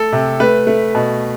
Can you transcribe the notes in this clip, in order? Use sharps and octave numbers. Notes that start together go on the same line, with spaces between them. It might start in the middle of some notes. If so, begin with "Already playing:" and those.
Already playing: A3 A4
C3
A3 B4
A3
B2